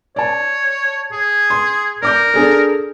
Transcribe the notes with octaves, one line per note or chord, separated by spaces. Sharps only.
C#5 D5 A5
G#4
C6
A#4 D5 D6 G6
D4 G#4 A4